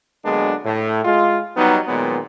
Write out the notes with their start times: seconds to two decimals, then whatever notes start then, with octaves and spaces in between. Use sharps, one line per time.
0.24 D3 F#3 G#3 A#3 B3 D4
0.65 A2
1.05 G#3 F4
1.56 F#3 G3 B3 D#4
1.87 A#2 D#3 F#3 G#3 B3